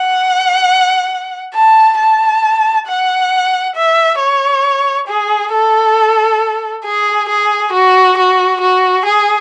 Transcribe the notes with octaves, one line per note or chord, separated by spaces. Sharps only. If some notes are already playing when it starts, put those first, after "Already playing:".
Already playing: F#5
A5
A5
F#5
E5
C#5
G#4
A4
G#4
G#4
F#4
F#4
F#4
G#4